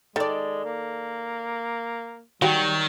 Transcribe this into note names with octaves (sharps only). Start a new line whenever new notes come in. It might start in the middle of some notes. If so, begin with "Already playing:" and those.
D#3 G#3 A4 D5
A#3
D#3 F#3 G3 F#4 G4 G5